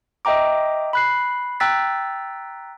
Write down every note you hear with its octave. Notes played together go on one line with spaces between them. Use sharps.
D#5 E5 G5 A#5 D6
B5 F#6 C7
G5 A#5 E6 F#6 A6 B6